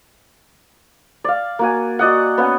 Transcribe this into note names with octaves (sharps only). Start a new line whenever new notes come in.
D5 F5
A#3 F#4 G#5
F#4 D5 D#5 F#5
B3 C#4 F#5